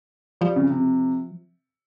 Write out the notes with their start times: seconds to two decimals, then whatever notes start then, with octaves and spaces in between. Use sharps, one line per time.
0.41 F3 G3
0.56 C#3
0.70 C3